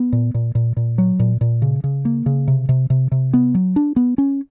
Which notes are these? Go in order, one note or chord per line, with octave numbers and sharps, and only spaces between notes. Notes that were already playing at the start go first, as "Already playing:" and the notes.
Already playing: B3
A#2
A#2
A#2
A#2
F#3
A#2
A#2
C#3
C#3
A#3
C#3
C3
C3
C3
C3
B3
F#3
D4
B3
C#4